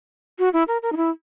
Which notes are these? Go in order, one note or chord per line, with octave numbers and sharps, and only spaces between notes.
F#4
E4
A#4
A#4
D#4
E4